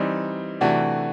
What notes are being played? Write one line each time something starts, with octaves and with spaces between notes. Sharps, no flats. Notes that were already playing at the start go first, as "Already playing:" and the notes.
Already playing: E3 G3 C4 D#4
C3 E3 A3 D4 F#4